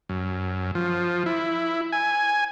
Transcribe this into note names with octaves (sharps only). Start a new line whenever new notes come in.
F#2
F3
E4
G#5